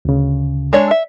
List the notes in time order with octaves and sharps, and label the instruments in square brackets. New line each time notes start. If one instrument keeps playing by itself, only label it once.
[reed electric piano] D2 C#3
[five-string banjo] G#3 D4 C#5
E5